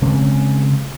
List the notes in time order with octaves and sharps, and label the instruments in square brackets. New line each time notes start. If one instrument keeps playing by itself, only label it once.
[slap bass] C#3 G#3 C4